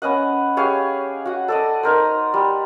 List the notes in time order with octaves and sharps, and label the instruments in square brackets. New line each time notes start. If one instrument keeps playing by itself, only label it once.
[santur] B3 C#4 D#5 F#5
G4 G#4 C#5 F5
F#4 F#5
A4 D5 D#5
D#4 A#4 C5
G3